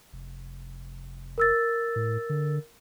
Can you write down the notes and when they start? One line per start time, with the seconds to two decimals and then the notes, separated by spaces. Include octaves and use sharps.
0.13 F1
1.38 A#4 E6 A6
1.96 A2
2.29 D3